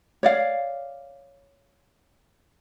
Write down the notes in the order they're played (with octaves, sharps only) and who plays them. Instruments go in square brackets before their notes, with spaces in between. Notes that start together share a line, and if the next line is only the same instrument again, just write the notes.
[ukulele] C#5 D5 F5